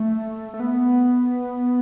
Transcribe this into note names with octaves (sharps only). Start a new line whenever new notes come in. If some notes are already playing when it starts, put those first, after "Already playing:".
Already playing: A3
A3
B3